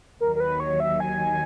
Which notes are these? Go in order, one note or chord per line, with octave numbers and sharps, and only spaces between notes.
D#2 D#3 F#3 A#4
A#4
B4
C#5
E5
G#5